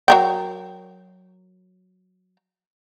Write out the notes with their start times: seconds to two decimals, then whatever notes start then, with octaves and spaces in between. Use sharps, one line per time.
0.08 F#3 A#4 G5